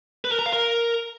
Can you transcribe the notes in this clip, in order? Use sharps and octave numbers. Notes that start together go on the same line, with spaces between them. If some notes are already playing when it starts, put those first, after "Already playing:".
B4
A#4
A#5
F5
A#4